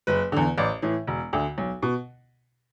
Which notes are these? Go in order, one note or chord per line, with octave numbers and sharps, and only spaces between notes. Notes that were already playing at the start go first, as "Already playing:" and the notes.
F#1 B4
E2 D3
A1 D5
A2 E3
E1
D2 D3
B1
B2